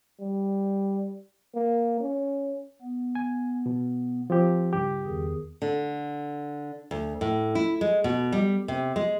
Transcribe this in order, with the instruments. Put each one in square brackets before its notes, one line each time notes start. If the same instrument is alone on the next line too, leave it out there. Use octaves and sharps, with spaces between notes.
[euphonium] G3
A#3
C#4
[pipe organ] B3
[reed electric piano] G#5
B2
F3 C4 G4
C#2 G2 G4
[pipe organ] E2 D#3 G#4
[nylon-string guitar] D3
D2
A2
E4
G#3
B2
G3
C3
G#3